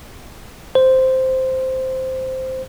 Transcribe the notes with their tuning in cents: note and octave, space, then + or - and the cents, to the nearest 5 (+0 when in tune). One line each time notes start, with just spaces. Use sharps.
C5 -5